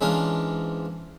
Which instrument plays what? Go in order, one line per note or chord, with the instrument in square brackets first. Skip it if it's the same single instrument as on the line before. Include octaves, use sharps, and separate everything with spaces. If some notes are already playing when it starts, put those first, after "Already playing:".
[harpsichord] G#2 E3 C#4 D4 F4